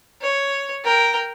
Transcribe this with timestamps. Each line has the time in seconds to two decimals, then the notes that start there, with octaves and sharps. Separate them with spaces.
0.22 C#5
0.84 A#4 G5